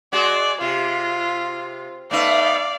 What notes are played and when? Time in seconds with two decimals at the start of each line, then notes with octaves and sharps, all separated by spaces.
0.12 G#3 F#4 G#4 D5
0.61 C3 F4
2.11 A3 B3 D#4 D5 F5